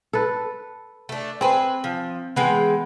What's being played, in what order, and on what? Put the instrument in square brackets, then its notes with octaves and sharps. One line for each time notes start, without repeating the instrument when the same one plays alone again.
[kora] A4 B4
[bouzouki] A3 D4
[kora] C4 [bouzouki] G#4 B4
[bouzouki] F3
[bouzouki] E3 G#3 G5 [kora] B3